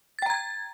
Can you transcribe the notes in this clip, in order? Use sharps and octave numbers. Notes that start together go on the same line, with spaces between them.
G5 A#5 G#6 A6